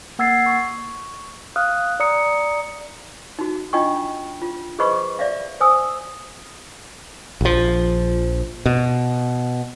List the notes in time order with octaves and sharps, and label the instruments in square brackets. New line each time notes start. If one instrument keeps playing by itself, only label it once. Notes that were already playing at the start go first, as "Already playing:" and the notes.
[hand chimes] A#3 F#5 E6 G#6 A6 C7
C#6
F5 D#6 F6 F#6
D5 A#5 D#6 C#7
[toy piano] D#4 F#4
D4 F4 D#5 G5 C#6
F4
G#4 B4 C5 D#5 B5 C#6
D5 E5 F5
C5 G#5 D#6 E6
[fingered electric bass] A#1 F3
B2